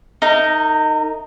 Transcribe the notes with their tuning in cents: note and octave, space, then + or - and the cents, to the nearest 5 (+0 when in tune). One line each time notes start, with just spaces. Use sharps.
D#4 +0 A#4 -35